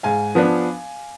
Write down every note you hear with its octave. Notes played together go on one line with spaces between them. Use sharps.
G#2 F5 G#5
F3 B3 D4